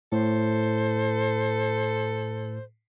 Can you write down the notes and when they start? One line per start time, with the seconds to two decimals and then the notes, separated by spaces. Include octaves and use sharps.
0.12 A2 A4 C5